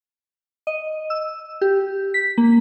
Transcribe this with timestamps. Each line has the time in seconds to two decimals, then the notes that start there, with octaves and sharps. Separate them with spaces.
0.67 D#5
1.10 E6
1.61 G4
2.14 B6
2.38 A#3